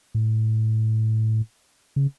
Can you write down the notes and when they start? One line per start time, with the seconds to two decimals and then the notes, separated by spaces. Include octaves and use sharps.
0.15 A2
1.96 C#3